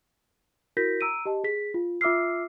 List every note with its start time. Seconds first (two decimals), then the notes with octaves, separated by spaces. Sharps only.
0.77 E4 F#4 A#4 G6 A#6 B6
1.01 A#5 E6 D7 D#7
1.26 G4 D#5 A5
1.44 G#4 B6
1.74 F4
2.01 F4 E5 D6 E6 F6 C7